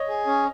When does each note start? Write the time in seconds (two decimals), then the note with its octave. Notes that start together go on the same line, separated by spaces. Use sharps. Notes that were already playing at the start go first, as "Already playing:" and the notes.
Already playing: C#5 D#5
0.08 G#4
0.27 C#4